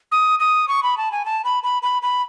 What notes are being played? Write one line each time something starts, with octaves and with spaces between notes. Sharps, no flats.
D#6
D#6
C#6
B5
A5
G#5
A5
B5
B5
B5
B5